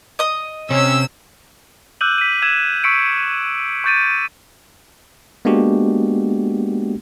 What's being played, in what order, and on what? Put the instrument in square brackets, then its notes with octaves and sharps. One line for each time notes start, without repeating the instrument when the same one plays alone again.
[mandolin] D#5 D#6
[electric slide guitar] C3 [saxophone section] C#4 [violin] E6
[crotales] D6 E6 F#6 G6 D#7 F#7
B6 D#7
E6 G#6 D#7 E7
C#6 E6 B6 C#7 D7
C#6 D6 G6 A6 D7 D#7
[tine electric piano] G#3 A#3 B3 D4 F#4 G4